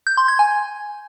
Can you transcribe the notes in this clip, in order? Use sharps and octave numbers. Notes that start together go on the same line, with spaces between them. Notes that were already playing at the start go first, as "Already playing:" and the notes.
G6
C6
G#6
G#5